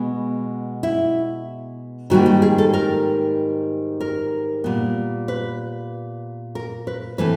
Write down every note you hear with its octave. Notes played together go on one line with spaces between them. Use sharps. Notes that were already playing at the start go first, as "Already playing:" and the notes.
Already playing: B2 G#3 B3
E4
G#2 D#3 G3 A#3 F#4
G4
G#4
A4
A#4
A#4
A#2 G3 B3
B4
A#4
B4
E3 A3 C4 B4